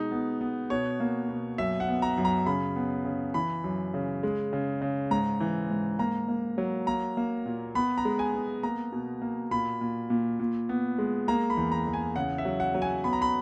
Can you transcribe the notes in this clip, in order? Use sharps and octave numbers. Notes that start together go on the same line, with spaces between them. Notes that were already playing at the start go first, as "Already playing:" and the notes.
Already playing: B2 G#3 D#4
B3
B3
B2 C#5
A#3
B2
F#2 E5
F#5
B3
A#5
F#2
A#5
C#3 B5
B3
C#3
E3 B5
F#2
C#3
G#3
C#3
C#3
G#2 A#5
E3
G#2
A#3 A#5
A#3
F#3
A#3 A#5
A#3
A#2
B3 B5
A#5
G#3
G#5
B3
A#3 A#5
B2
A#3
A#2 B5
A#2
A#2
A#2
B3
G#3
A#3 A#5
B5
E2
A#5
E2
G#5
C#3 F#5
E5
F#3
F#5
F#3
G#5
B3 B5
A#5
B5